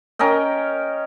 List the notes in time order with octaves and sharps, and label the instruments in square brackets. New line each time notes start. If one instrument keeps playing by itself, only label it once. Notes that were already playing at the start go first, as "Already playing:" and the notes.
[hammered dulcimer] C#4 A#4 D#5 G5